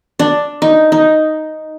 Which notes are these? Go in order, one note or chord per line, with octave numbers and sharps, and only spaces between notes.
D4
D#4
D#4